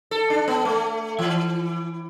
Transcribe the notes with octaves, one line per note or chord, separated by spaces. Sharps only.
A4
D4
B3
A3
E3